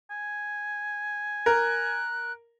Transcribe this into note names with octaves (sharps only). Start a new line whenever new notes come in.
G#5
A#4 F#6